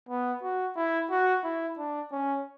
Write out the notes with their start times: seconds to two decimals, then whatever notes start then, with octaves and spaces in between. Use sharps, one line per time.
0.09 B3
0.43 F#4
0.76 E4
1.11 F#4
1.44 E4
1.78 D4
2.12 C#4